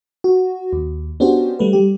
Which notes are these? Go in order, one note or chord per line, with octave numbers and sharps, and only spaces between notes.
F#4
D#2
B3 C#4 D4 F#4 G4 C5
G3 A3 B4
G3 G4